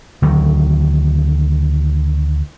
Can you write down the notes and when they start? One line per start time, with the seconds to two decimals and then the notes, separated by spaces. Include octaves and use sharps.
0.22 D2 D#3 F#3